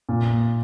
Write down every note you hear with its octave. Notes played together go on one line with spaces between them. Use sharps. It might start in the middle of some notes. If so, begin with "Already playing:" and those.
A#2